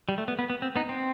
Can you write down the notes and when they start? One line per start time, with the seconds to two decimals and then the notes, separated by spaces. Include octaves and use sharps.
0.09 G3
0.18 A3
0.28 B3
0.39 B3
0.50 B3
0.62 C4
0.76 B3 D#4
0.89 C4